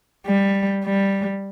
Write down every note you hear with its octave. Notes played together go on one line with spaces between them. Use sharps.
G3
G3